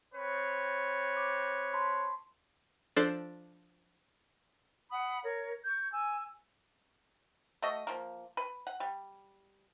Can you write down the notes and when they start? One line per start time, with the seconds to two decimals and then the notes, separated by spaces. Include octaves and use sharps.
0.15 C4 B4 C#5
1.17 D6
1.74 A5 B5 C6
2.96 F3 D4 A4 C5
4.91 F#5 B5 D#6
5.23 A#4 C#5
5.64 C#6 G6
5.92 G#5 E6
7.62 A3 F#4 D#5
7.87 F3 A#3
8.37 B4
8.67 F#5
8.80 G3